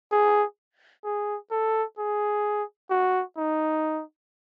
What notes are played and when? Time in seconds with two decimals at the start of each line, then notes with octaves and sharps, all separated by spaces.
0.12 G#4
1.04 G#4
1.51 A4
1.98 G#4
2.90 F#4
3.37 D#4